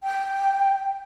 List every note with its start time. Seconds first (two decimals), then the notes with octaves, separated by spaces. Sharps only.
0.03 G5